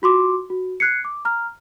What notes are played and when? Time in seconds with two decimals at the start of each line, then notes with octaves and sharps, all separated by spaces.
0.02 F4 F#4 C6 D6
0.50 F#4
0.80 F#6 G#6 C7 C#7
1.05 D6
1.25 A#5 F6